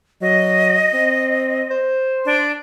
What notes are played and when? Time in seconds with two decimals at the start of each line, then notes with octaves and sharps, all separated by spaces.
0.22 F#3 D#5
0.93 C4
1.70 C5
2.25 D4